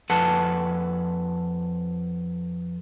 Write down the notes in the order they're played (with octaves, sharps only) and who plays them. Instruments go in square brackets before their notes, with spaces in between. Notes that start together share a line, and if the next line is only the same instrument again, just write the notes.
[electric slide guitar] F2 A4 B4 F#5 A5